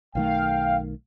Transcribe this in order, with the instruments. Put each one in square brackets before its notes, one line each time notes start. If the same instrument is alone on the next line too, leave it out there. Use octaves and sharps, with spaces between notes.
[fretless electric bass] B1 D#3 A3 [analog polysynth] F5 [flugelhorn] G5